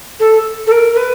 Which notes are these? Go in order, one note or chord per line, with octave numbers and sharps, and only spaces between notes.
A4
A4
A#4
A#4
B4